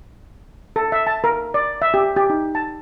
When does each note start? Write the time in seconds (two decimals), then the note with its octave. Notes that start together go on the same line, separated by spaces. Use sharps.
0.76 A4
0.92 E5
1.07 A5
1.24 A#4
1.54 D5
1.82 E5
1.94 G4
2.16 G4
2.30 D#4
2.55 A5